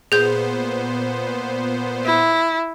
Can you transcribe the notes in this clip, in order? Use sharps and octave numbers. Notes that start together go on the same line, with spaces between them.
A#2 B3 G#4 C5 G6
E4